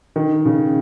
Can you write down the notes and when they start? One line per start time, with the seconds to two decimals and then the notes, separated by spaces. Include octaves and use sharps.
0.16 D#3
0.46 C#3